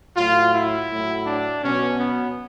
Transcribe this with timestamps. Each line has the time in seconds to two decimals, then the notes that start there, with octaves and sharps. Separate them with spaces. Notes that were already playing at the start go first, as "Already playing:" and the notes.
0.16 A2 F#3 F4
0.54 E4
0.91 A2 F#3
1.26 D4
1.64 B2 F#3 C#4
2.00 B3